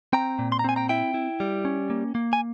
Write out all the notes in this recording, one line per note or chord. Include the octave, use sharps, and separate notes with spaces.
C4 G5 A#5
A#2
C6
A#5
C4 G#5
G5 A#5
E4 E5 G5
E4
G3
C#4
A#3
A#3
G#5